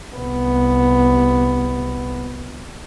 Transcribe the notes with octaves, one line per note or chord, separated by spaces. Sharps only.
C2 B3